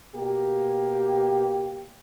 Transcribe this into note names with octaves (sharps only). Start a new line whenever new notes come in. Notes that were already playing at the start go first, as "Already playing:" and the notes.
B2 A#3 G4